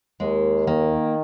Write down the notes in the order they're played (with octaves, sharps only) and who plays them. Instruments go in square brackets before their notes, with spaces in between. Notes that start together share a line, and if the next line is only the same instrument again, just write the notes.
[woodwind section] D#2 [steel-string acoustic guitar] G#3
[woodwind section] D#3 [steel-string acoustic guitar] A#3